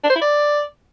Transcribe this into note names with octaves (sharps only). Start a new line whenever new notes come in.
D4
C5
E4
D5